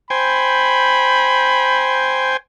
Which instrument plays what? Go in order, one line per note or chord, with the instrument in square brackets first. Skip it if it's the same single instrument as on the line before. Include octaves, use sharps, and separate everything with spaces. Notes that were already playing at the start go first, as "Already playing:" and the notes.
[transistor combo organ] C5 G5 G#5 [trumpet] B5